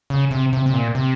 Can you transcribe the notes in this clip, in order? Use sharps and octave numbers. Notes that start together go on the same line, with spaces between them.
C#3
C3
C3
C3
A#2
C3